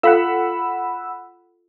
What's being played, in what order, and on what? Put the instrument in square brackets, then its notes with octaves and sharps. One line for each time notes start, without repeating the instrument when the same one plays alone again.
[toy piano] F4 A4 F5 [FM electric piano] F#5 B5 E6